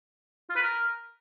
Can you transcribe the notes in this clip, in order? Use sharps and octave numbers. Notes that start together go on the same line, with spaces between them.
F4
B4
A#4